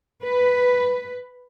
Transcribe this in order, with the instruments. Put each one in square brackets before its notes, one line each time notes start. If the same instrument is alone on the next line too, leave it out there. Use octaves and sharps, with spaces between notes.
[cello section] B4